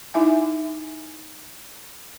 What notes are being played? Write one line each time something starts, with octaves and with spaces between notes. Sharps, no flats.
D#4 E4 E5 G#5